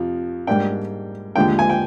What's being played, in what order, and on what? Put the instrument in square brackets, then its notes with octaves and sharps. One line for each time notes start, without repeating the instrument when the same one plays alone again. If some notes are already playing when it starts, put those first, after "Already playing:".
Already playing: [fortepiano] F2 C3 F3
G#2 G3 A#3 D4 G5
D#2 D3 F3 G#3 D4 G5
G#5
G5